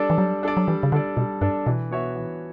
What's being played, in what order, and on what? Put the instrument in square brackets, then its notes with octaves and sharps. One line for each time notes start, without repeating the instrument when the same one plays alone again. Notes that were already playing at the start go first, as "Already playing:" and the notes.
Already playing: [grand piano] G3 D4 A4 D5
[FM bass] E3
[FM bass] F#3 [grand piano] G3
[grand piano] D4 A4 D5
[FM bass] F#3
[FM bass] E3 [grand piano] G3
[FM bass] C#3
[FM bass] D3 [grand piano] D4 A4 D5
[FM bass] B2 [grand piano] G3
[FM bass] G2 [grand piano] D4 A4 D5
[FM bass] B2 [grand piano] E3
[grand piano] B3 F#4 C#5 E5
E3